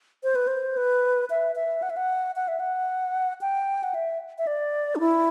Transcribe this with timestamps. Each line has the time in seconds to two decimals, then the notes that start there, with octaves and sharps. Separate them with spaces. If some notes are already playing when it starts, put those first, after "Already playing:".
0.24 C5
0.35 B4
0.47 C5
0.77 B4
1.30 E5
1.56 E5
1.82 F#5
1.90 E5
1.97 F#5
2.36 F#5
2.48 E5
2.60 F#5
3.41 G5
3.83 F#5
3.94 E5
4.38 E5
4.47 D5
4.96 D4
5.00 E4